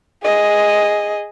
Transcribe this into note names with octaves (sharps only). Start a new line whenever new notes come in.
G#4 D#5